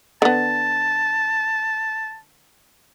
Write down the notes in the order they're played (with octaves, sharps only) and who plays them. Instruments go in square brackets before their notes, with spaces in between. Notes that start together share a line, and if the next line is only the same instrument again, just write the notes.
[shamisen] D3 B3 [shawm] A5